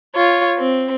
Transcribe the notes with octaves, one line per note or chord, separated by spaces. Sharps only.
F4 C#5
C4